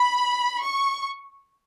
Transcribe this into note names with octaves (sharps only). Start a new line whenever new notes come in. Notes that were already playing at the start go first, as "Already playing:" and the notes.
Already playing: B5
C#6